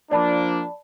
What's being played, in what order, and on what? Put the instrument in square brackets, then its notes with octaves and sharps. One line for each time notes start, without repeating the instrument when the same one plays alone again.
[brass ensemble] F3 A#3 D4 [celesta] D5 A5 B5